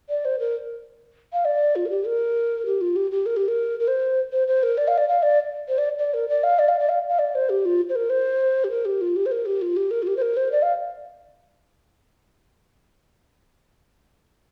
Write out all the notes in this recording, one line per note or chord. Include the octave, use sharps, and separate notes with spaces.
D5
C5
A#4
F5
D5
F4
A#4
G4
A#4
G4
F4
G4
G4
A#4
G4
A#4
A#4
C5
C5
C5
A#4
D5
F5
D5
F5
D5
C5
D5
D5
A#4
D5
F5
D5
F5
D5
F5
F5
D5
C5
G4
F4
C5
A#4
C5
G4
A#4
G4
F4
G4
C5
A#4
G4
F4
G4
A#4
F4
G4
C5
A#4
C5
D5
F5